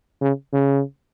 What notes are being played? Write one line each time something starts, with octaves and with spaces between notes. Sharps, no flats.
C#3
C#3